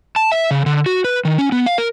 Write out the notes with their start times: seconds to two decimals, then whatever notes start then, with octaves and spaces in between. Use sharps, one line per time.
0.16 A5
0.32 E5
0.51 C#3
0.66 D3
0.86 F#4
1.04 B4
1.25 D#3
1.38 C#4
1.52 B3
1.66 F5
1.78 A#4